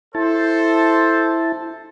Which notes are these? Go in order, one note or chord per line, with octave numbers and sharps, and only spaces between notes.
E4 A4 C5 A5